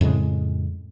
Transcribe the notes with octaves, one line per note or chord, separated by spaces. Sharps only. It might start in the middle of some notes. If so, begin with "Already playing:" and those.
F2 A2 C#3 G#3